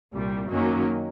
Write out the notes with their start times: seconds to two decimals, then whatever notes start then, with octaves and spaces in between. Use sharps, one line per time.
0.14 C2 A#2 G3
0.51 F#2 D#3 F#3 A#3 C#4